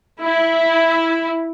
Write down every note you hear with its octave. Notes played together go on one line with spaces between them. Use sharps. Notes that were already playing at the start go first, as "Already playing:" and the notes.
E4